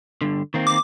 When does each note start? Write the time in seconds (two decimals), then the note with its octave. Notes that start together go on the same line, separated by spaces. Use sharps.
0.21 G2 D3
0.54 D#3 A#3 C4
0.67 D6